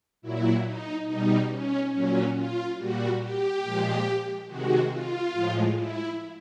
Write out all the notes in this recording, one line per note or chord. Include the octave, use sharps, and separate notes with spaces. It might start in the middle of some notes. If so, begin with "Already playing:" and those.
A#2 F#3 E4
D#4
B2 G3 D#4
C#4
A#2 F#3 C#4
F4
A#2 G3 F#4
G4
A#2 F3 G#3
C3 D#3 G#3 F#4
F4
A2 F3 G#3
E4